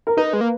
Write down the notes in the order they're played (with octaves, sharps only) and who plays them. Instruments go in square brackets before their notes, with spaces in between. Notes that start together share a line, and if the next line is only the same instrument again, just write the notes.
[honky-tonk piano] A#4
[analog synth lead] D#4 [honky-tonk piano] B4
[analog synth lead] G#3
A#3